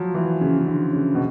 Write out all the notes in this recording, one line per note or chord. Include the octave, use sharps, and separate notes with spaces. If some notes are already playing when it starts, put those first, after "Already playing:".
Already playing: F3 F#3
E3
C#3
C#3
D3
C#3
B2